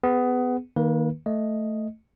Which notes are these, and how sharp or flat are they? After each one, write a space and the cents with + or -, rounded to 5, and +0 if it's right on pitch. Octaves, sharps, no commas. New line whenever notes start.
B3 +20 G#4 +0
D#3 +0 A#3 +0 B4 -30
A3 +0 D#5 +0